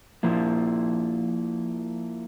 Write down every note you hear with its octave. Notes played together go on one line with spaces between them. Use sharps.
F3 A#3 E4